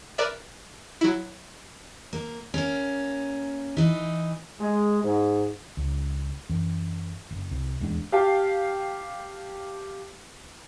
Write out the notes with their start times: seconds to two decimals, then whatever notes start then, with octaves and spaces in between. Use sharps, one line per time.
0.18 A#4 B4 D5 E5
1.01 F#3 E4
2.13 A#3
2.54 A#3 C#4
3.77 E3 D#4
4.60 G#3
5.03 G#2
5.77 C#2
6.49 F#2 E3
7.31 F#1
7.51 C2
7.80 D#1 E2 G#3 D4
8.12 G4 F5 G5 A5